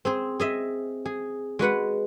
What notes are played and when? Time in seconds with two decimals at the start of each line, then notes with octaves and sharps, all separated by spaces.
0.05 C4 G#4 C5
0.40 G#4 D#5 E5
1.05 G#4
1.59 G#3 F#4 B4 F#5